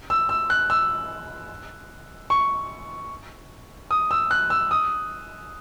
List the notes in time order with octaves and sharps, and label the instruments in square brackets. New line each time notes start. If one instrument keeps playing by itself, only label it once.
[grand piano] E6
E6
F#6
E6
C#6
D#6
E6
F#6
E6
D#6